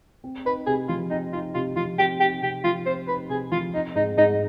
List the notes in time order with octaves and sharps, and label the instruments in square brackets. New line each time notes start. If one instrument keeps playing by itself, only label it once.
[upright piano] C4
[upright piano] D#4 [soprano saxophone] B4
[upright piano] C3 [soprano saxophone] G#4
[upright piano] F3 [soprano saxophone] F4
[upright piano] C4 [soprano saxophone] D#4
[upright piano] D#4 [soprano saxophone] F4
[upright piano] C3 [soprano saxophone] F4
[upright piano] F3 [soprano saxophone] F4
[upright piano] C4 [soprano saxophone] G4
[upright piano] D#4 [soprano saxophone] G4
[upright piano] C3 [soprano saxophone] G4
[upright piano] F3 [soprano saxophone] F4
[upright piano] C4 [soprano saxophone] C5
[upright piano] D#4 [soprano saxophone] B4
[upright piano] C3 [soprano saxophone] G#4
[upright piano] F3 [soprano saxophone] F4
[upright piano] C4 [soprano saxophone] D#4
[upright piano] G#2 [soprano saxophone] D#4
[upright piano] G#2 [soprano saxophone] D#4